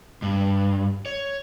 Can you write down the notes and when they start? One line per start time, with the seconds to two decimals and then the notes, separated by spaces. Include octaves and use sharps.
0.22 G2
1.06 C#5